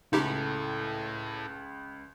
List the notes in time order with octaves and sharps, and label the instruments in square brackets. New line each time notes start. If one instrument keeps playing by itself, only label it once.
[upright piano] C#2 [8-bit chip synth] D#4 G4 [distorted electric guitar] E4 A4